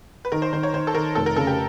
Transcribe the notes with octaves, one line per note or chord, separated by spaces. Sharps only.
B4
D#3 A#4
C5
D#3 C5
C#5
D#3 C5
A4
D#3 A#4
F1 A4
A#4
C#3 A4
G4